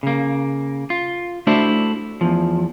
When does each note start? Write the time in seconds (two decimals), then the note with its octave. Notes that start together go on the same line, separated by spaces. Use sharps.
0.03 C#3 A#3
0.90 F4
1.47 A3 D4 E4 F#4 C5 E5
2.21 E2 F3